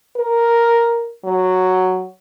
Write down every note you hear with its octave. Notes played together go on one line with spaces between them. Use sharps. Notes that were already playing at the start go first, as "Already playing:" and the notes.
A#4
F#3